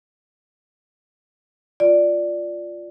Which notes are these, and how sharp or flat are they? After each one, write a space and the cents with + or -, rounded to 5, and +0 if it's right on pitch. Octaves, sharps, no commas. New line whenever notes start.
F4 +0 D5 +0